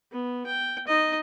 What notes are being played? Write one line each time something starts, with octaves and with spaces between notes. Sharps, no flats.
B3
G5
D#4 D#5